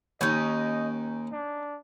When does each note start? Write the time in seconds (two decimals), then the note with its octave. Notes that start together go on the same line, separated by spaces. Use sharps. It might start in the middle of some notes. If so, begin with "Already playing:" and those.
0.21 D#2 C#4 D#4 D#5
1.32 D4